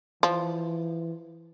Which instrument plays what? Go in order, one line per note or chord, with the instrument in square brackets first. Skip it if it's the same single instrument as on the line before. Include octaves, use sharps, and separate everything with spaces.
[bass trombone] E3 [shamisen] F3